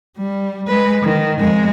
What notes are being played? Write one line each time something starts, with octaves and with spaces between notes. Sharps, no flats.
G3
G#3 B4
D#3
F2 G#3